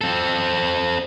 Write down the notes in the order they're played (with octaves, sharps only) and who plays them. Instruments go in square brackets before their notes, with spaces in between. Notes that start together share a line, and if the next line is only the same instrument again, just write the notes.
[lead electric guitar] C4 A4